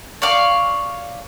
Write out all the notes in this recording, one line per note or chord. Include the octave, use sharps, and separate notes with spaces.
C#5 D5 F5